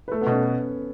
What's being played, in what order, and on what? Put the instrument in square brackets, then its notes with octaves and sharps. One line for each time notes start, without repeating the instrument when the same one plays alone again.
[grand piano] B4
[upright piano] A3 [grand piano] A4
[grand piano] B3
[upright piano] B2
[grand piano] C#4